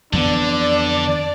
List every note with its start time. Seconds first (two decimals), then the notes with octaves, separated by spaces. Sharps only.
0.13 F2 D3 E3 B3 D4 D5